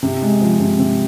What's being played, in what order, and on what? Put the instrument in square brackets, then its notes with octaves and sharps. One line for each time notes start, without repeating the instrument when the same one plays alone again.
[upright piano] C3
G#3
F3
C3
C3